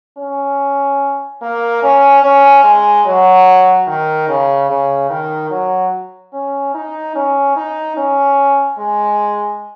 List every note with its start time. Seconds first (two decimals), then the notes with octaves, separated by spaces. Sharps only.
0.18 C#4
1.42 A#3
1.83 C#4
2.23 C#4
2.64 G#3
3.05 F#3
3.87 D#3
4.28 C#3
4.69 C#3
5.10 D#3
5.50 F#3
6.33 C#4
6.74 D#4
7.15 C#4
7.56 D#4
7.97 C#4
8.78 G#3